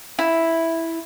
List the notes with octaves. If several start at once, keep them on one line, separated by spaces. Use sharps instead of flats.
E4